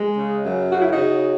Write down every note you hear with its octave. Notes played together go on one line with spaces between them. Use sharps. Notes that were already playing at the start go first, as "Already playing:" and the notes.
Already playing: G#3
C#3
F#2
C#3 F#4
E4
D#4 F#4
C#3